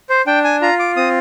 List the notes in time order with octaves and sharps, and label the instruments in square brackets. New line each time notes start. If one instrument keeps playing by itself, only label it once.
[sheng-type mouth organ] C5
D4 G5
G#5
F4 A#5
D6
C4 D#6